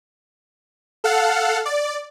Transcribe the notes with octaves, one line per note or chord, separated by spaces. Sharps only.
A4 F5 F#5
D5